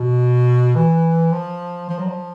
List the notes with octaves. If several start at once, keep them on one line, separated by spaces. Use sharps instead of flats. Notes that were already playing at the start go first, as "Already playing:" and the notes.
Already playing: B2
E3
F3
F3
F#3
F3